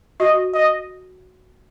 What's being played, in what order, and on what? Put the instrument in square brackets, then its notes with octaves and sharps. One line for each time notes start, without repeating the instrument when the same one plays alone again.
[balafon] F#4 [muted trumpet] D#5
[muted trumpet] D#5